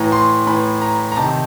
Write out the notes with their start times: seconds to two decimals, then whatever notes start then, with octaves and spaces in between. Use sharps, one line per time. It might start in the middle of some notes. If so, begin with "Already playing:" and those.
Already playing: A2 E3 A#5
0.12 C6
0.47 A2 E3 B5
0.81 A#5
1.12 A#5
1.16 C3 D#3 A5